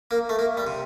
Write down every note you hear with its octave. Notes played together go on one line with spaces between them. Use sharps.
A#3
A3
A#3
G3
C3